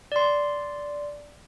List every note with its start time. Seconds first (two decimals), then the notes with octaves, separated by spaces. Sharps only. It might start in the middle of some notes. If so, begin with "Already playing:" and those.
0.12 D5 C6